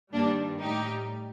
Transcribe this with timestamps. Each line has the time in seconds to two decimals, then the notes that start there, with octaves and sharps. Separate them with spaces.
0.13 G2 D#3 G3 A#3 D4
0.60 A2 G3 D#4 G4